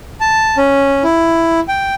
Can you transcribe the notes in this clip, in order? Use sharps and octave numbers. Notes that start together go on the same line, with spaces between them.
A5
C#4
E4
G5